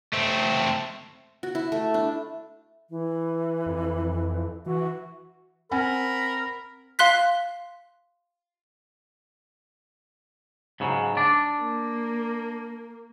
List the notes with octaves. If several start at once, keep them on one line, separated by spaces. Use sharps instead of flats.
A3 C4
F#4
E4
A3
D4
E3
F2
E3 F#4
C4 A#4 F#5 G#5 B5
F5 C6 F#6 B6
G#2 C#3 F#3
D4 D5
A#3